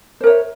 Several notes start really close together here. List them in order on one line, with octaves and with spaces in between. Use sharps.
C5 A#4 C#5 E5